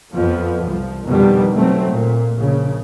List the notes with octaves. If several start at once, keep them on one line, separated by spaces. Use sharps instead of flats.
F2 F3 B3
C2 F3
F2 B2 D3 D#3 G3
B2 F#3 A3 C4
A#2
A#1 C#3